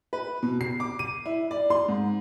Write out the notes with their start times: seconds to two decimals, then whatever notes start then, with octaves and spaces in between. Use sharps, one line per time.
0.13 B4
0.43 B2
0.61 C7
0.80 D6
0.99 D#7
1.26 E4
1.51 D5
1.70 C6
1.88 G#2